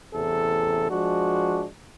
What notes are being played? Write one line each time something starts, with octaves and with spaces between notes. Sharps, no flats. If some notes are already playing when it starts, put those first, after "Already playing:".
A1 E2 C3 A4
F3 G#3 D4 F#4